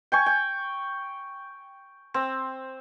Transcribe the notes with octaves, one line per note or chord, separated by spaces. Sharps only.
G5 G#5 C#6
G5
C4